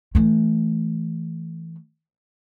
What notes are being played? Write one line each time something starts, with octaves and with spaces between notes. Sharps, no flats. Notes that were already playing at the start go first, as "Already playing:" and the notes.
E3 A3